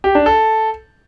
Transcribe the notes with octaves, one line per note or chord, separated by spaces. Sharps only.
G4
D4
A4